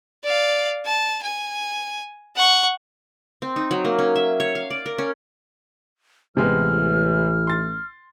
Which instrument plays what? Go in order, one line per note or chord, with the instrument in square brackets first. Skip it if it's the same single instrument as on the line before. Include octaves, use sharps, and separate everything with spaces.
[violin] D5 F5
A5
G#5
F#5 C#6
[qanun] C4
D#4
F#3
A#3
C#4
E5
C#5
F5
D5
A#4
C#4
[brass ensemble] A1 E3 [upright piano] C3 G#3 B3 [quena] F6
[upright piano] C6 A6